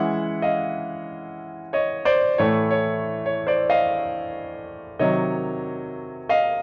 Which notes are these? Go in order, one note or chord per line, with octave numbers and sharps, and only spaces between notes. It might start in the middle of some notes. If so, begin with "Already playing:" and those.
Already playing: E3 G#3 C#4 E5 F#5
D#5 F5
C#5 D#5
C5 D5
A2 E3 A3 C#5
C#5
C#5
C5 D5
D#5 F5
C3 D#3 F#3 C#5 D#5
D#5 F5